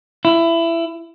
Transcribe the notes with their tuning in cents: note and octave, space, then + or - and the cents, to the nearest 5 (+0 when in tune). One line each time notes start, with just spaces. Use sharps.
E4 +20